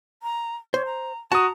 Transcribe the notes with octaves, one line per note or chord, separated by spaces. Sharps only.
A#5
C5 C#5
A#5
F#4 A5 A#5 D#6